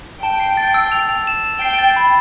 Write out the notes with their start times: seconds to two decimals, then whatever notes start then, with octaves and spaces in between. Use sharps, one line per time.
0.23 G5 A5
0.40 C7
0.57 A6
0.74 E6
0.92 F7
1.09 F7
1.27 E7
1.44 E7
1.61 G5 C7
1.79 A6
1.96 B5